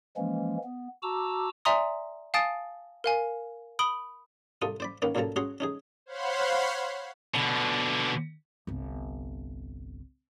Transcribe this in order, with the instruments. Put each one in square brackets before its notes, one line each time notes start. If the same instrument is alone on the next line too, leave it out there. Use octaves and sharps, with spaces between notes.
[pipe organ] E3 F3 G#3 A#3 C#4
B3
F#4 A5 A#5 D6 E6
[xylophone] D5 E5 G#5 A#5 C6 D#6
F5 G#5 A5 D#6 A6 D7
A#4 F5 G#5
B5 D#6 D7 F#7 G7
[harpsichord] C2 F4 A4 D#6
C5 D5 B5
D#3 A#3 B3 C#4
B1 A#2 C#3 F3 A4 A#5
C#4 F#4 G#4 F#5 A#5 C6
C#4 D#4 G#4
[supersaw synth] C5 C#5 F5 F#5 B5 C6
[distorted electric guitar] B2 D3
[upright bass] G1 C2